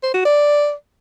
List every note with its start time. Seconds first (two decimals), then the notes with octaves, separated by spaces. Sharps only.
0.03 C5
0.14 F#4
0.25 D5